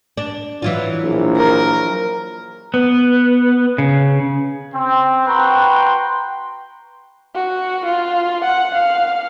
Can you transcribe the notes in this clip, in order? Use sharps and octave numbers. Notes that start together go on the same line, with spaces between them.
D4
E3 F#3 F4
A#1
A#4
B3
C#3
C4
F#4 B4 G5 A#5 C6
F#4
F4
F#5
F5